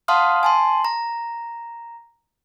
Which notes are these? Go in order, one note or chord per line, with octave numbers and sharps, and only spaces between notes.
F5 F#5 A5 C6 D#6 F6
G#5 A5 C6
A#5